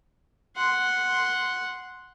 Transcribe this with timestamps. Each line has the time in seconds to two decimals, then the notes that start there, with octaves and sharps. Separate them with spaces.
0.56 F#5 C6